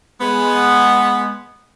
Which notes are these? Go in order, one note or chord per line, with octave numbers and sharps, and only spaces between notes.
G#3 B3